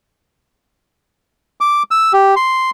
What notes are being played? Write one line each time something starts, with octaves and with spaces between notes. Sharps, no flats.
D6
E6
G4
C6